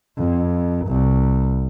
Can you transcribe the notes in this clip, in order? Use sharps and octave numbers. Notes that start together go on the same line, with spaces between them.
F2
C2